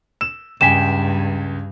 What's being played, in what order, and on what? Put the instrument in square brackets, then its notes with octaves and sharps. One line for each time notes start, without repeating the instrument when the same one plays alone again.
[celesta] E6 [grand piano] E7
[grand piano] C#2 G5 G#5 [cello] G2 [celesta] B6 E7